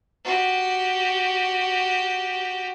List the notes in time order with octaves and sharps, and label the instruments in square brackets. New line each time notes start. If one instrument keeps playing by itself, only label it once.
[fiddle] F#4 G4